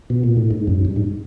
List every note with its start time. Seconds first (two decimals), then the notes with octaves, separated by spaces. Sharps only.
0.10 B2
0.24 A#2
0.37 A2
0.51 G#2
0.67 F#2
0.85 G2
0.96 G#2